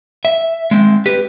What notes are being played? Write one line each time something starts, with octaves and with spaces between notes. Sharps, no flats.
E5
G#3 C4
G4 B4